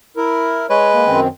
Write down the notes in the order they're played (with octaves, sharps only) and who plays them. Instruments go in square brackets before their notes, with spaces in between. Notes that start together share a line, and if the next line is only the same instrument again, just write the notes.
[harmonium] E4 A#4
[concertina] G#3 B4 [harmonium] C#5
[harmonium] A#3
F#2 D#3 C4